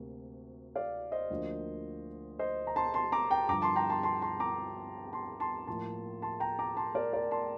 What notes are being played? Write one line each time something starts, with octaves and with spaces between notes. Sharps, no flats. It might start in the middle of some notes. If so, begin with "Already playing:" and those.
Already playing: D2 C3 A#3
D5 F5
C5 D#5
D2 D3 F3 A#3
C5 D#5
A#5
A5 C6
A5 C6
A#5 D6
G5 A#5
G2 D3 F3 A#5 D6
A5 C6
G5 A#5
A5 C6
A5 C6
A5 C6
A#5 D6
A5 C6
A5 C6
A2 F3 A#3 A5 C6
A5 C6
G5 A#5
A#5 D6
A5 C6
A#4 D5
A#4 D5
A5 C6